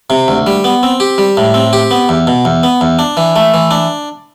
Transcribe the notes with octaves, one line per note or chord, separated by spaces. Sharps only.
C3
D2
G3
B3
C4
G4
G3
A2
C4
G4
B3
E2
B2
E2
B3
E2
D4
E3
A3
E3
D4